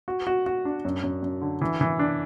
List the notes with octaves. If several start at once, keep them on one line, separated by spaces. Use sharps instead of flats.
F#4
F#4
F#4
D4
F#2
F#2
F#2
D3
E3
E3
D4